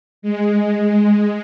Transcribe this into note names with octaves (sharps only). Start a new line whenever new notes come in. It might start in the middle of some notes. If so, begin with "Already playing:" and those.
G#3